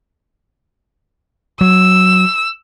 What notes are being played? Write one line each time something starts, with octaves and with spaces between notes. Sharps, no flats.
F#3 E6